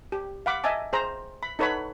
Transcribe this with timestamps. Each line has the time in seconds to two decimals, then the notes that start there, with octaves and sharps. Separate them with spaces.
0.12 G4
0.46 F5 F#5 B5 D6
0.64 D#5 E5 G#5 A5 D6
0.93 G#4 C5 A#5
1.43 B5
1.59 D#4 A4 B4 C#5 F#5 B5